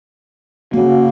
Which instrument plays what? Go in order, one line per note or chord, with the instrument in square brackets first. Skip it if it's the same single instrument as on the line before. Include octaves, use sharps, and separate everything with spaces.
[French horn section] C#3 F#4 [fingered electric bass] A#3